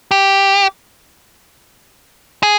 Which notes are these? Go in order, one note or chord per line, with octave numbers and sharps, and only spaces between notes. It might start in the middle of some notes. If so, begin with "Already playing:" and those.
G4
G#4